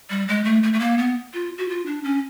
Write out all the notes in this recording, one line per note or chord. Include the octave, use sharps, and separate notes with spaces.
G3
G#3
A3
A3
A3
A#3
B3
F4
F#4
F4
D4
C#4